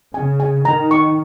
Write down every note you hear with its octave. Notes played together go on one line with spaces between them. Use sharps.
C#3 G#5
G#5
D#3 A#5
C#6